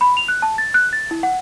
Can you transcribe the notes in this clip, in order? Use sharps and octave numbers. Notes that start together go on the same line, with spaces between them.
B5
F7
F#6
A5
A6
F#6
A6
E4
F#5